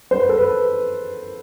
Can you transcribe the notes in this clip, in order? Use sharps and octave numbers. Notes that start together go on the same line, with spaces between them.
C5
B4
A4
B4